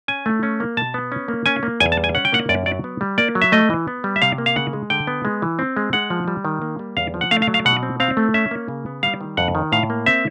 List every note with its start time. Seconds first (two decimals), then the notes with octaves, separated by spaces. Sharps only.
0.08 C#4 G#5
0.26 A3
0.43 C#4
0.60 A#3
0.77 B2 A5
0.94 B3
1.12 C#4
1.28 A#3
1.46 C#4 G#5
1.63 A#3
1.80 E2 G#5
1.92 A5
1.97 G3
2.04 G#5
2.15 C#4 F#5
2.25 G5
2.32 A#3 F#5
2.49 F#2 D5
2.66 F#3 D5
2.84 B3
3.01 G3
3.18 A#3 D5
3.35 F#3
3.42 E5
3.52 A3 D#5
3.70 E3
3.87 B3
4.04 G3
4.16 E5
4.22 C3 F5
4.38 A#3
4.46 F5
4.56 C#3 F#5
4.73 G#3
4.90 D3 G5
5.07 B3
5.25 G#3
5.42 E3
5.59 C4
5.77 G#3
5.93 G#3 F#5
6.10 F3
6.28 G3
6.45 D#3
6.62 A#3
6.79 G3
6.97 E2 F5
7.14 F3
7.21 F#5
7.31 A3 F5
7.42 F5
7.48 F#3
7.54 F5
7.65 B2 F#5
7.83 C4
8.00 C4 F5
8.17 A3
8.34 C#4 E5
8.51 A#3
8.68 C#3
8.86 B3
9.03 G3 F5
9.21 D#3
9.37 F2 F#5
9.55 D#3
9.72 A2 F5
9.90 A#3
10.06 C4 E5